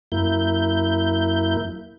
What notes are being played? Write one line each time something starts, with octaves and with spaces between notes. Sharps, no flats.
F#2 A#3 E4 G6